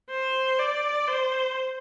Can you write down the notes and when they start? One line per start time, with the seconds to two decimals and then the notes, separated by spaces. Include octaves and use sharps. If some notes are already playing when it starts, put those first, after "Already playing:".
0.10 C5
0.59 D5
1.07 C5